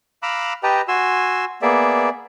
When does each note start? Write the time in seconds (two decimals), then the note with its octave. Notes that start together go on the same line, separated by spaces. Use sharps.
0.23 F5 A#5 B5 D6 E6 F#6
0.63 G4 B4 D#5 G5 A5 A#5
0.88 F#4 G#5 C6 E6
1.62 A#3 B3 G#4 D5 E5